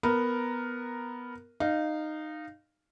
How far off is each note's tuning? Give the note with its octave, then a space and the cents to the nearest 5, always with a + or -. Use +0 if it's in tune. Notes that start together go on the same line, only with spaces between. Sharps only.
B3 +0 A#4 +0
D#4 -15 F5 +0